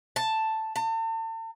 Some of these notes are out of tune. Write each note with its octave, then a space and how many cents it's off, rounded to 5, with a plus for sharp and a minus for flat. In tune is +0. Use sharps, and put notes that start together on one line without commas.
A5 +5
A5 +40